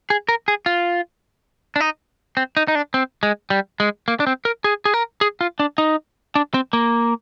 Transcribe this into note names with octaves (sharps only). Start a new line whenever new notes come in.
G#4
A#4
G#4
F4
D4
D#4
C4
D#4
D#4
D4
C4
G#3
G3
G#3
A#3
D4
C4
A#4
G#4
G#4
A#4
G#4
F4
D4
D#4
D4
C4
A#3